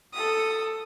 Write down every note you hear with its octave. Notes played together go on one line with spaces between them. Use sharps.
A4 D#6